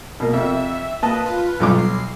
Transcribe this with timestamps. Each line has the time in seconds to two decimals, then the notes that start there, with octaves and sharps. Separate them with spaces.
0.20 B2 A#3
0.33 F2 C3 E5
1.03 A#3 B4 D#5 A5
1.25 F4 B4
1.60 B1 G2 F#3 G3 F4 D6
1.79 C7